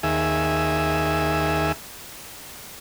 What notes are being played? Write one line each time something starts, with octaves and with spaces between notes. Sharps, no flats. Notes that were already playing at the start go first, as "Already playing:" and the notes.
D#2 G#4 E5